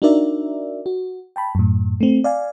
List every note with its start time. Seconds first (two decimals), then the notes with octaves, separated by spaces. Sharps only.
0.02 D4 D#4 F#4 A#4 D5 E5
0.86 F#4
1.36 G5 A5 B5
1.55 F#2 A2
2.01 A3 C4
2.24 D5 F5 G#5